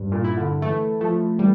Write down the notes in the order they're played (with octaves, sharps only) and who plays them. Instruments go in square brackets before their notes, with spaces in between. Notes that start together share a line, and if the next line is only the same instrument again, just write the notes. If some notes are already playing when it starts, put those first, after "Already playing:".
Already playing: [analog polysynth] G2
[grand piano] A#2
[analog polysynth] E4
[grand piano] D3
[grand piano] E3 [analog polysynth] A3
[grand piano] F3 [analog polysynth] A3
[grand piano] E3 [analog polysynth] G3